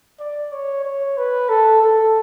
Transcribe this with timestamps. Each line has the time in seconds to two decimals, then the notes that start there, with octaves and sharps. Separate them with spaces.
0.19 D5
0.52 C#5
0.85 C#5
1.18 B4
1.49 A4
1.83 A4